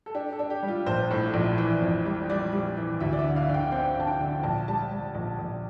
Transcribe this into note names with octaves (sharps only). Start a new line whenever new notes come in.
A4
D4 G4
A4
D4
G4
G3
F4
A#1 C5
A2
A#1
E3
F2
G3
G3 D5
G3
E3
D2 E5
D5
E5
D3
F5
D3
G5
C4 G5
D3 A5
G5
D3
A#1 A5
G3 A5
G3
A#1
A#1